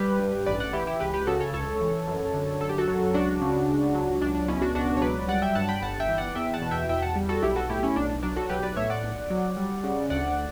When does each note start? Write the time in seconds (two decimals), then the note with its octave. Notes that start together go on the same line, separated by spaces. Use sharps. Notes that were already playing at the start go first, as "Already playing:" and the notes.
Already playing: G3 G4 B4
0.19 G2
0.46 A1 B4 D5
0.60 D5 F#5
0.73 E3 E4 G4
0.87 E4 G4
1.00 C#2 G4 B4
1.14 G4 B4
1.27 C#3 F#4 A4
1.40 A4 C#5
1.53 C#2 A4 C#5
1.81 E3
2.07 F#2
2.34 D3
2.61 F#2 A4
2.69 G4
2.78 F#4 A4
2.88 F#3
3.14 C#2 D4 F#4
3.41 C#3
3.68 C#2
3.95 F#3
4.22 C#2 D4
4.35 D4
4.48 B2 C#4 E4
4.62 D4 F#4
4.75 C#2 D4 F#4
4.97 C#5
5.02 F#3 B4 D5
5.28 G3 D5 F#5
5.42 E5 G5
5.55 G2 F#5 A5
5.69 G5 B5
5.82 G1 F#5 A5
6.00 E5 G5
6.09 E3
6.18 D5 F#5
6.35 E2 E5 G5
6.54 F#5 A5
6.62 B2
6.71 E5 G5
6.89 E2 E5 G5
7.02 F#5 A5
7.16 G3
7.29 F#4 A4
7.42 B1 E4 G4
7.56 F#4 A4
7.69 A2 E4 G4
7.83 C#4 E4
7.96 B1 D4
8.09 D4
8.23 F#3 D4
8.36 F#4 A4
8.49 B1 G4 B4
8.63 B4 D5
8.76 A2 C#5 E5
8.90 D5 F#5
9.03 B1
9.30 F#3
9.57 G3
9.84 C#3
10.10 D2 D5 F#5